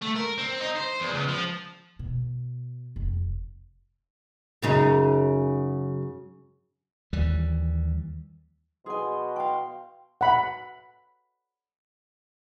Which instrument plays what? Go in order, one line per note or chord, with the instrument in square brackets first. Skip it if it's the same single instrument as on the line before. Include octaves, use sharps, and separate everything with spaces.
[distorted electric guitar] A3
A#4
C4
D#4
C5
E2
C#2
F3
[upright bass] B2
F1
[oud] F#2 C#3 D#4
[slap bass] D#2 E3 G3
[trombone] B2 [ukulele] G#4 G#5 [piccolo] C6
[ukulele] F5 G5 [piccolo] C6
[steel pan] F#5 B5